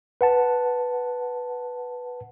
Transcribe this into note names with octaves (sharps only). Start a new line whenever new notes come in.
B4 F#5 A5